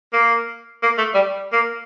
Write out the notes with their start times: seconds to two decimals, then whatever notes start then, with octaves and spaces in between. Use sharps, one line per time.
0.13 A#3
0.83 A#3
0.98 A3
1.14 G3
1.53 A#3